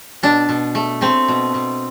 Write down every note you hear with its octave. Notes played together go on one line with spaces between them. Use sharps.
B2 D4
B2
A3
A3 C4
B2
B2